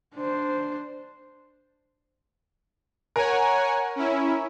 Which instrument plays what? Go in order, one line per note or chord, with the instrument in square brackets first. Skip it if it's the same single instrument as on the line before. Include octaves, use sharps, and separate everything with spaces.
[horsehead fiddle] D4 C5
[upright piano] A#4 A#5 [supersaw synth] C#5 F#5 G#5
[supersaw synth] C#4 E4